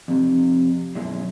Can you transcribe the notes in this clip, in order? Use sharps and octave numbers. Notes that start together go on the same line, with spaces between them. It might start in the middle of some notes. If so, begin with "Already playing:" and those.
F2 C3
F#2 B2 G#3 E4 G#4